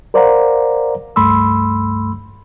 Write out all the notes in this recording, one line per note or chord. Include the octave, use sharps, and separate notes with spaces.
A#4 C5 D5 F5 F#5 A#5
C#2 G2 A3 B5 C6 E6